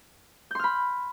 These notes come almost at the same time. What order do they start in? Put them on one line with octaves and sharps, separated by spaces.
G6 C6 F6 B5